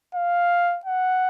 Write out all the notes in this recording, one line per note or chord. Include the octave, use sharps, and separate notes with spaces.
F5
F#5